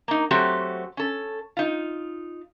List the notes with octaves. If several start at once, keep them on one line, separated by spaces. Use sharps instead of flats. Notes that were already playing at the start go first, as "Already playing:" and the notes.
A#3 D#4
F#3 A3 C4 F#4 G4
C#4 A4
D#4 F4